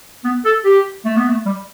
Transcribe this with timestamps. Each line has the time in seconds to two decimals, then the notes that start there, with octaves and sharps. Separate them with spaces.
0.25 B3
0.45 A4
0.65 G4
1.05 A3
1.17 B3
1.28 A3
1.46 G3